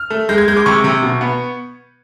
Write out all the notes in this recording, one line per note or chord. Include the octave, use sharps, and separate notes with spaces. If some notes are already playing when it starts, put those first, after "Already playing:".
Already playing: F6
A3
G#3 G6
G#6
G#3 G6
D6
C3 C#6
C3
B2
B3